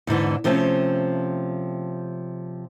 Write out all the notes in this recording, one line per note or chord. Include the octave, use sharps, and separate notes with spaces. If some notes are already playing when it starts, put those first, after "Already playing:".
E2 G#2 D3 E3
C3 F3 A3 C4 C#4